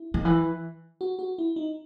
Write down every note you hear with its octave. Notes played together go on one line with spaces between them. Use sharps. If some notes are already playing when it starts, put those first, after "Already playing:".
Already playing: E4
D#3
E3
F#4
F#4
E4
D#4